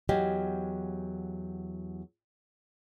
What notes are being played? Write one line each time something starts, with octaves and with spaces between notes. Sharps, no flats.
E2 F#3 G4 D#5 F5 G#5